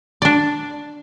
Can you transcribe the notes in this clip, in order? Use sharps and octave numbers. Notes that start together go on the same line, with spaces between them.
D4 D5